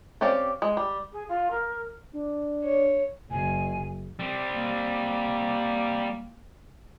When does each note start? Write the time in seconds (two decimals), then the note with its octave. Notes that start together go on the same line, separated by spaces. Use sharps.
0.21 C4 C#4 G4 D5 F5
0.62 G#3
0.77 G3
1.13 G#4
1.29 F4
1.51 A#4
2.13 D4
2.64 C#5
3.31 F#1 G#5
4.19 G3 C4
4.54 A#3